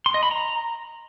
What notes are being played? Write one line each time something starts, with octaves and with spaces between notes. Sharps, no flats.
C6
D#5
B5
A#5